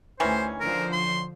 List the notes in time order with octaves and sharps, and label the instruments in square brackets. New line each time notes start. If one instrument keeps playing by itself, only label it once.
[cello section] D2 [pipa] D#3 E3 C#4 [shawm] C5
[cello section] D3 F3 C5 [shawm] A#4
[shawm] C6